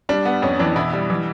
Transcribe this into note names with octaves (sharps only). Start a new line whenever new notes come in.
G3 D4
B3
F2 C#4
E3 D4
B2 E4
G3
E3